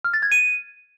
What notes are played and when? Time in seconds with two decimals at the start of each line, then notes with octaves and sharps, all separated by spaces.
0.04 F6
0.14 A6
0.23 G#6
0.32 D#7